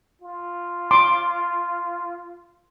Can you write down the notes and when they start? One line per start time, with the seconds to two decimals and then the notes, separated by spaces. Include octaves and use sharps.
0.22 F4
0.91 C6 D6